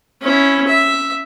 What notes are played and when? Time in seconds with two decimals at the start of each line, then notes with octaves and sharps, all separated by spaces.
0.22 C#4 E4
0.67 E5